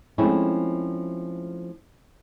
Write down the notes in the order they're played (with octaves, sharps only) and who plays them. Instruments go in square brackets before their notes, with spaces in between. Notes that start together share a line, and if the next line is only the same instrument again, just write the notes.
[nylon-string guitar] F3 G#3 A3 C4 C#4 E4